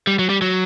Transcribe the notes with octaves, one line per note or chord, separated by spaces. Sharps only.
G3
F#3
G3
F#3